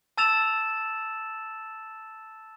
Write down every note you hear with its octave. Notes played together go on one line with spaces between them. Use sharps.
A5 E6 A6 E7 F7